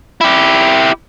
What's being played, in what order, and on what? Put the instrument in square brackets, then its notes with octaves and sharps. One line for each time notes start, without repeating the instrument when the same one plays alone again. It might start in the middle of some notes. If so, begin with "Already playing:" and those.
[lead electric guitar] E4 G4